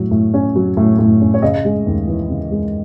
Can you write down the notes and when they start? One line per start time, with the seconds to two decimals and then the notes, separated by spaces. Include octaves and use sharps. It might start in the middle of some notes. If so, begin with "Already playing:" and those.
Already playing: A2 F#3
0.11 A2
0.34 C#4
0.56 F#3
0.77 A2
0.99 A2
1.21 C#4
1.34 C#5
1.42 C#3 D#5
1.65 G#3
1.87 D#2
2.07 E3
2.29 C#3
2.51 G#3